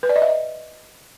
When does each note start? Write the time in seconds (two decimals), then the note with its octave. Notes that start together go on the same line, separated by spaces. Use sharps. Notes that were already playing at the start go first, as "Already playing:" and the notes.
0.03 B4
0.09 D5
0.16 D#5
0.22 E5
0.28 D#5